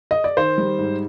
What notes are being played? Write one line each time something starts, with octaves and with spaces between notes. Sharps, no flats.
D#5
D5
D#3 C5
G3
G#2